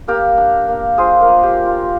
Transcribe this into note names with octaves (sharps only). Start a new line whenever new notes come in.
A#3 G4 A#4
D4
A#3
F4 G#4 C5
A#4 D5
A#3
G4
D4
F4